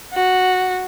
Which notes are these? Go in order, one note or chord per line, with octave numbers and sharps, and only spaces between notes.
F#4